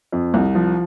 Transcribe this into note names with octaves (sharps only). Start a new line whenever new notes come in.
F2
C2
F3